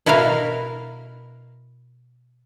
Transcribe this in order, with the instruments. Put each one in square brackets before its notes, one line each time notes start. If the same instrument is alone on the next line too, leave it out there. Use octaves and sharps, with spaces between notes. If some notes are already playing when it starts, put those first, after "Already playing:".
[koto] B2 E4 F#4 A#4 F5